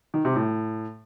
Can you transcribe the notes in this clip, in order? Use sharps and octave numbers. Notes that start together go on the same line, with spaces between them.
D#3
C3
A2